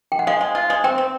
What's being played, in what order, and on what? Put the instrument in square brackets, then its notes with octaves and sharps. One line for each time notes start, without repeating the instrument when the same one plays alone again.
[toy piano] G5
F#5
[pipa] G#3 [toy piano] F5
[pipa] G#3
F4
G#3
[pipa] C4 [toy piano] G5
[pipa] C4